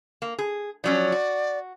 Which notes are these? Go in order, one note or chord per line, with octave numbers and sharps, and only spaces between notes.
A#3
G#4
F3 F#3 C#4 D5
F#4